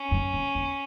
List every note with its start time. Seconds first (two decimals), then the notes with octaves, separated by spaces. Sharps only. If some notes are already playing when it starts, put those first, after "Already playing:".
Already playing: C#4
0.11 F#2
0.33 F#2
0.55 E2